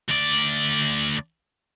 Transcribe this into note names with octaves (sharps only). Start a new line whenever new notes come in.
D2 D5